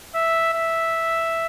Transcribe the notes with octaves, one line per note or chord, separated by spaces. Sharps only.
E5
E5